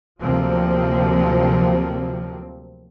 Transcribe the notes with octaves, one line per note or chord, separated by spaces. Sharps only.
D2 C3 F3 F#3 A#3 C4